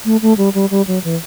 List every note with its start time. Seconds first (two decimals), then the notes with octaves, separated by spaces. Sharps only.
0.05 A3
0.22 A3
0.38 G3
0.54 G3
0.71 G3
0.87 F#3
1.04 E3